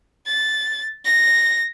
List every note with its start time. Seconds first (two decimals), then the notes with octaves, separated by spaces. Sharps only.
0.27 A6
1.05 A#6